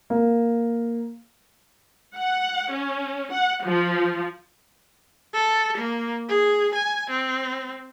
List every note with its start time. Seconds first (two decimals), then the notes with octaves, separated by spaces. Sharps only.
0.10 A#3 F5
2.16 F#5
2.73 C#4
3.32 F#5
3.66 F3
5.33 A4
5.78 A#3
6.29 G#4
6.75 G#5
7.10 C4